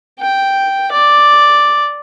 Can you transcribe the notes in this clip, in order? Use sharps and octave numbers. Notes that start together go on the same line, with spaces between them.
G5
D5